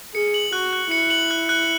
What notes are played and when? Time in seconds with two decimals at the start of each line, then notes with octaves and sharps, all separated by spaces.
0.14 G#4 C#7
0.34 F#7
0.53 F#4 F#6
0.73 F#6
0.91 E4 C#7
1.10 F#7
1.31 F#6
1.49 F#6